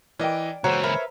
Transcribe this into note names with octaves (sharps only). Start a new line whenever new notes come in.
E3 A#4 D5 D#5 G5
C#2 E3 F#4 A4 C5 C#5 A#5
A#4 B4 E5